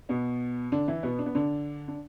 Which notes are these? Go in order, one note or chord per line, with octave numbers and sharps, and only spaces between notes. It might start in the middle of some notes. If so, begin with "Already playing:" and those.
B2 B3
D3 D4
E3 E4
B2 B3
D4
B3
D3 D4
D4